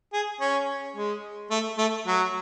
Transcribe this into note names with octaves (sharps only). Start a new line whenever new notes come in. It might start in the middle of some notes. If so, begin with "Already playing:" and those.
G#4
C#4
G#3
A3
A3
F#3